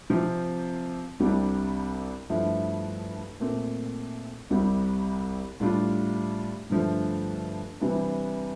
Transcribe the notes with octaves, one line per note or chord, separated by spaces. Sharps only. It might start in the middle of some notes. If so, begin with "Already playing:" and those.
C3 F3 C4
C2 C3 G3 D4
G2 F3 A3 E4
A#2 A3 C4
C2 C3 G3
A2 G3 D4 F4
G2 D3 F3 A3
C3 E3 G3 D4